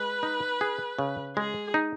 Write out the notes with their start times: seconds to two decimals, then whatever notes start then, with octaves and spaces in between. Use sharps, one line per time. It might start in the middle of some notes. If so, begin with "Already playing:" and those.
Already playing: G#3 B4
0.23 D#4
0.61 G#4
0.99 C#3
1.37 G#3 G#4
1.74 D#4